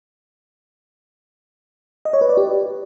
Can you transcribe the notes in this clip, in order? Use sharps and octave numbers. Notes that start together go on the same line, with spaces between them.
D#5
C#5
B4
D5
G4